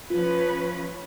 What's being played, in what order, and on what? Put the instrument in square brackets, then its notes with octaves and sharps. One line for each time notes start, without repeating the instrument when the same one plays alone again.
[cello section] F3 C#4 B4 [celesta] F4